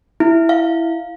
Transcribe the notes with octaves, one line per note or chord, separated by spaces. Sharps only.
E4
F5